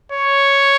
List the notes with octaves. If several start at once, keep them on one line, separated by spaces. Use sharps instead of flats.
C#5